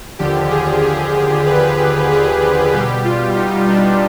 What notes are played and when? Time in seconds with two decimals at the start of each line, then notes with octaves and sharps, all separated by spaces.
0.19 D#2 D3 F3 G4
0.50 G#4
0.82 G#4
1.46 B4
2.10 G#4
2.73 B2 G3 G4
3.05 F4
3.36 D#4
3.68 D4